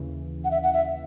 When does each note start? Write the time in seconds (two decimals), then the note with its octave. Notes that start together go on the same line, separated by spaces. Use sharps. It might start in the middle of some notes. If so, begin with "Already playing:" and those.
Already playing: D#2 C#3 E3
0.44 F#5
0.51 E5
0.63 F#5
0.73 E5